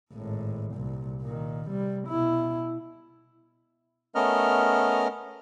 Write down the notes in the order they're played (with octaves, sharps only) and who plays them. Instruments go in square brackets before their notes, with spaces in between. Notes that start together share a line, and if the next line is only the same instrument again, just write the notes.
[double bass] G#1 A2
C2 A#2
A#2 D#3
C3 G3
B2 E4
[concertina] A3 B3 C#4 A#4 D#5 F6